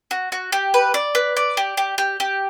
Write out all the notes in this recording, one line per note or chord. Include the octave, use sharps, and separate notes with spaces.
F#4
F#4
G4
B4
D5
B4
D5
G4
G4
G4
G4